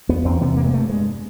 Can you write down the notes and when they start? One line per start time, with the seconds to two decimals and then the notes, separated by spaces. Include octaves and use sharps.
0.09 E2 B3
0.25 E2 C4
0.41 C3 B3
0.57 G2 A#3
0.66 G#3
0.74 G2 A3
0.90 G2 G#3